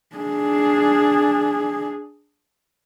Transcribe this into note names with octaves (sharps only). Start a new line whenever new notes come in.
D4 G#4